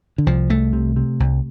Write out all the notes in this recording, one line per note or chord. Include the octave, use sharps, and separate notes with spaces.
D3
C2 F3
C2 A3
C3
C3
C2